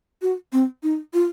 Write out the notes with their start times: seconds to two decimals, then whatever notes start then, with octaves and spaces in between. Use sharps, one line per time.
0.22 F#4
0.53 C4
0.83 D#4
1.14 F4